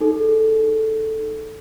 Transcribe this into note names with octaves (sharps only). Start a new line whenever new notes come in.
D#4 G#4 A4